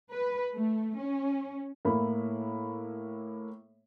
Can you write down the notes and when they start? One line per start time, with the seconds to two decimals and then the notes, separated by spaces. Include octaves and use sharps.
0.11 B4
0.55 A3
0.98 C#4
1.85 A2 A#3 E4 B5